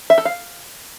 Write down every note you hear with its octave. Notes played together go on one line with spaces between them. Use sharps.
E5
A4
F5